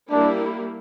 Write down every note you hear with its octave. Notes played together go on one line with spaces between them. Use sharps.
G3 A#3 D4 E4